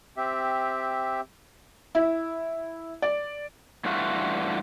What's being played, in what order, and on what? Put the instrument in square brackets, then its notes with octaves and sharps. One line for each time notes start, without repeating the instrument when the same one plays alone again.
[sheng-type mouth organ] C4 G4 E5
[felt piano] E4
D5
[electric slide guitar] G2 E3 A3 F4 F#4